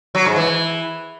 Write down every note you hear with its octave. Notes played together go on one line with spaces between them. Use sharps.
F#3
G#2
E3